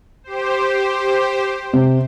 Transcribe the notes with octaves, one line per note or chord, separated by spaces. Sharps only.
G4 C5
C3